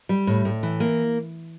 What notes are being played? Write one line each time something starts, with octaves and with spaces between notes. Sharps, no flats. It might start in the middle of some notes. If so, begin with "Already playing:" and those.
G3
A2
A2
E3
A#3